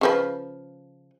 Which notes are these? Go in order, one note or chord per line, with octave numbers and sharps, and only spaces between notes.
C#3 F3 B4